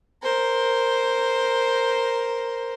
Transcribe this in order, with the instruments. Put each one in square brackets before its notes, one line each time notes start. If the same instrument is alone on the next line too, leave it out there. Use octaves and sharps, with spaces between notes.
[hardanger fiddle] A#4 C5